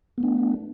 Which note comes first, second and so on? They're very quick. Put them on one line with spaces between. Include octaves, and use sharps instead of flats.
B3 A3 D4